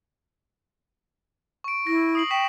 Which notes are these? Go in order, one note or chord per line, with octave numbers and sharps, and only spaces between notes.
C#6 D7
E4 A#6
D#6 C7 F#7
G5 C#6 B6 E7